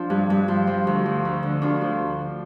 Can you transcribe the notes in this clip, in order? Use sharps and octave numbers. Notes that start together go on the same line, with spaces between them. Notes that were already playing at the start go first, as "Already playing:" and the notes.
Already playing: F3 D4 F4
G2
G2
F3
F3
D2
F3
D2
D3
D2 D4 F4
F3